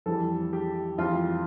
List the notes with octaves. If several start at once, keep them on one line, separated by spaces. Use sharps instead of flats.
F2 E3 G3 A4
G4
F2 E3 G3 F4